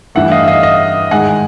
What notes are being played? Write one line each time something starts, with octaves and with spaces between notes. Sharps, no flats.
G2 E3 A3 E5 F#5
D#5 F5
E5
D#5 F5
D#5 F5
G#2 D#3 G#3 F#5 G#5